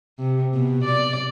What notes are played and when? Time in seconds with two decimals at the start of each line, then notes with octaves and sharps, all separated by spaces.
0.19 C3
0.54 B2
0.85 D5